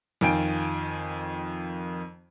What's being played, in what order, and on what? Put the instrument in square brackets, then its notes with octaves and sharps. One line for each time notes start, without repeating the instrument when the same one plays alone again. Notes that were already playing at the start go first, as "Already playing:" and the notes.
[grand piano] F2 D#3 F4 G5 G#5 D7